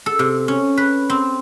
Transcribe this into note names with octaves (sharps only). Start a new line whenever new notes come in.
A4
C3
C#4
B4
C4